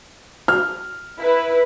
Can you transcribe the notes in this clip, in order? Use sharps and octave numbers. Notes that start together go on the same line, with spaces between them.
F6
E4 B4